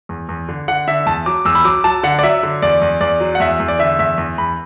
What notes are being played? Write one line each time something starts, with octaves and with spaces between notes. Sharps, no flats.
E2
E2
D3
D3 F#5
D3 E5
E2 A5
F#3 D6
E2 E6
B5
F#3 D6
F#3 A5
D3 F#5
D5
F#3 E5
D3
E2 D5
E2
E2 D5
F#3
F#5
E2 E5
E2
D5
D3 E5
E2 E5
E2
E2 B5